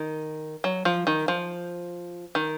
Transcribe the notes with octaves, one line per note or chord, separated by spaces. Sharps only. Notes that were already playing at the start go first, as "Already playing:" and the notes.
Already playing: D#3
F#3
F3
D#3
F3
D#3